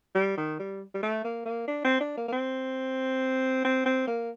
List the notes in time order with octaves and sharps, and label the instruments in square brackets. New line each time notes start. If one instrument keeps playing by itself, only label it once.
[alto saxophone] G3
D#3
G3
G3
A3
A#3
A#3
D4
C4
D4
A#3
A#3
C4
C4
C4
A#3